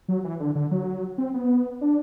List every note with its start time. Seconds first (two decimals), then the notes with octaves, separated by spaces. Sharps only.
0.08 F#3
0.24 E3
0.40 D3
0.55 D3
0.71 F#3
1.18 C4
1.34 B3
1.81 D4